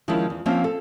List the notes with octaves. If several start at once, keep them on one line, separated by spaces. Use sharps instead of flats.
D#3 F3 G#3 C#4 D#4 E4
E2
F3 A#3 C4 C#4 F4 E5
A4